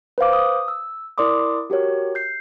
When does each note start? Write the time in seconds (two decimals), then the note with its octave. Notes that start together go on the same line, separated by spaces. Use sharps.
0.18 B4 C5 F5 D6
0.33 D#6
0.68 E6
1.18 E4 A#4 D5 C6 D6 D#6
1.70 F#4 G4 A#4 C#5
2.15 G6 C7